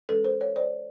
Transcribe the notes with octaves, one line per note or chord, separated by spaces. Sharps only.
E3 G#3 C#4 A4 B4
A#4 C5
B4 C#5
C5 D5